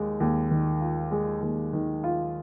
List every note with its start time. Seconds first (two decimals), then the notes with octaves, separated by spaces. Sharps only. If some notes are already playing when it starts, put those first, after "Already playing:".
Already playing: D#2 G#3
0.20 D#2
0.51 D#3
0.81 F4
1.11 G#3
1.42 D#2
1.73 D#3
2.04 F4